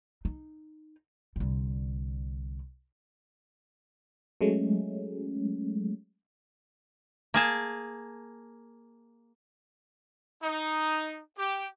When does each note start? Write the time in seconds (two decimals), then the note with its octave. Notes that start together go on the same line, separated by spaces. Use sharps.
0.25 D#4
1.36 C2 D3
4.41 F#3 G#3 A3 C#4
7.34 A#3 G#4 A5
10.43 D#4
11.38 G4